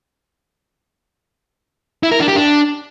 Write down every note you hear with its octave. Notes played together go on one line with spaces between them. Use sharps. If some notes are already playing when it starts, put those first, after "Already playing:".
E4
A#4
D4
G4
D4